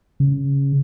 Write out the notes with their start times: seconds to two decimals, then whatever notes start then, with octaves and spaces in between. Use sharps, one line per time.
0.20 C#3